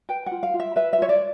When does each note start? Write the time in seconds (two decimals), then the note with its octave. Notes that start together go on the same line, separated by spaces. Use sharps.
0.09 B4 G5
0.26 F#5
0.31 F4
0.43 F5
0.54 F4
0.60 E5
0.76 B4 E5
0.93 E5
0.98 F4 C#5
1.09 D5